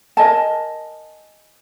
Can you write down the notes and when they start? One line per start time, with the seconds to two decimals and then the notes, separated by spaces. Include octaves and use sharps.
0.17 A#4 D#5 G#5 A5